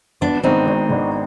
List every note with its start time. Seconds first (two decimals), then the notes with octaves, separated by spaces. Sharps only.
0.21 G#1 B3 D4
0.43 G#2 D#3 B3 C4 D4 D#4
0.66 G#1
0.89 G#2 D#3 B3 D4